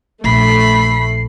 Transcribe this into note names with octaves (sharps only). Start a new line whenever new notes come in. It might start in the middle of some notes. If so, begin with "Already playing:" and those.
A#1 A3 B5 C7